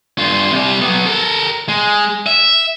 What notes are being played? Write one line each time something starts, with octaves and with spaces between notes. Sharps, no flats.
G2 F4
C3 G3
F#3 B3
A4 A#4
G#3
E5